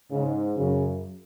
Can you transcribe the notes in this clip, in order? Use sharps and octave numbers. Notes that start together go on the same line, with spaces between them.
G#2 C#3
F#2 C#3